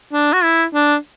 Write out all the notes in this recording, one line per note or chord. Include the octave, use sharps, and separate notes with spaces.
D4
F#4
E4
D4